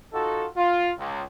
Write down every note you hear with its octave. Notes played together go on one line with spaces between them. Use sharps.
D#4 F4 F#4 A4
F4
C#2